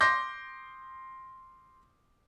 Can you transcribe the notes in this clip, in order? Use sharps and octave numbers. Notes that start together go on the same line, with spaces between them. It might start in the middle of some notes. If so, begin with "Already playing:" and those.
C6 D6 G6 A#6